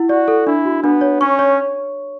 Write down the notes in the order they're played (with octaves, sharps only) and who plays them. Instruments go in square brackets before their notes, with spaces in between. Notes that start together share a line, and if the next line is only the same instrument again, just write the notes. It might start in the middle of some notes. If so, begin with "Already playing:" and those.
Already playing: [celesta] E4 F#5
[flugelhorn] F#4 [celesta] D5
[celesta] A4
[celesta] D4 [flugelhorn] E4
[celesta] F#4
[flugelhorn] B3 [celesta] D4
[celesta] C#5
[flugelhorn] C#4 [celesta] C#6
[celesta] C#5